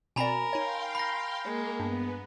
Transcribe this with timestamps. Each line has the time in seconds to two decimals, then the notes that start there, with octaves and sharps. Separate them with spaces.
0.16 B2 C4 A#4 D5 G#5 A#5 B5
0.53 D#4 C#5 F5 G5 C6
0.95 B5 A#6
1.44 G#3 A#3 A#4
1.80 G2 B3